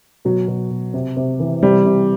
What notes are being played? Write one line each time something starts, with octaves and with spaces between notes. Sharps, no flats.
B2 F#3
B2
B2
C3
C3
E3
C3 G3
C3